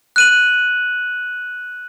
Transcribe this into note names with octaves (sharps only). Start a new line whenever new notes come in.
F#6 D#7 F#7